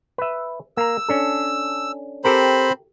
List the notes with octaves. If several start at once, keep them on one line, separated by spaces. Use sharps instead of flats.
B4 E5
A#3 A#5 E6
C#4 D4 A4
C4 G4 A4 A#4 C5 B5